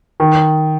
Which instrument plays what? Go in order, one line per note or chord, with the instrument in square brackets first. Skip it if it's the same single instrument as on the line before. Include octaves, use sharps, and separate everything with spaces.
[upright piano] D#3